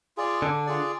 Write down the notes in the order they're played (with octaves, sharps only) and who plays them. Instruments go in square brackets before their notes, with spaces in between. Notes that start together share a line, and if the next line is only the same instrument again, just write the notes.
[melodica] F4 G#4 D5
[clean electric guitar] D3 [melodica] D4
[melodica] F4 G#4 D5